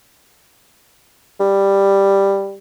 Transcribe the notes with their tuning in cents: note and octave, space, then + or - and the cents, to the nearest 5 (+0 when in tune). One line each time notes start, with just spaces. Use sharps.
G3 +5